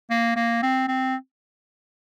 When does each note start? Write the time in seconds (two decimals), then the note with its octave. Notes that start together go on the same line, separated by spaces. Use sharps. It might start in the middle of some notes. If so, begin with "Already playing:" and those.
0.10 A#3
0.36 A#3
0.63 C4
0.88 C4